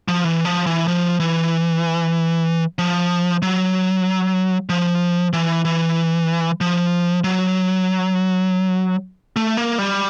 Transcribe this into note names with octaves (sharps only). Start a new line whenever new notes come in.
F3
E3
F3
E3
F3
E3
F3
F#3
F3
E3
E3
F3
F#3
A3
A#3
G3